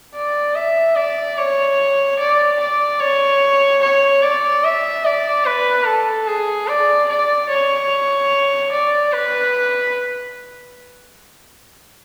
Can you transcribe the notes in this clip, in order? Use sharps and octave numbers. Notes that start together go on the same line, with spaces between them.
D5
E5
D5
C#5
D5
D5
C#5
C#5
D5
E5
D5
B4
A4
G#4
D5
D5
C#5
D5
B4